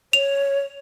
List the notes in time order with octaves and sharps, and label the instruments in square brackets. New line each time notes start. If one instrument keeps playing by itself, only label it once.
[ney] C#5 [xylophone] F7